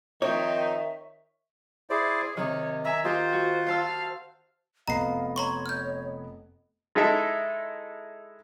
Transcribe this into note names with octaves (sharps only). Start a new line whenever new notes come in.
D#3 F3 C4 D#4 C#5 E5
E4 G#4 C5 D5
C3 D#3 C#5
E5 G#5 A#5
D#4 F4 G4 C5
F#4
C5 F5 A5 E6
F1 B3 D#5 F5 A#5 C7
C#5 A#5 C6 C#6
F6 G6
G#3 D#4 E4 A4 E5